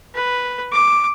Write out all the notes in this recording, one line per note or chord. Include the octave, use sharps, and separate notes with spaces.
B4
D6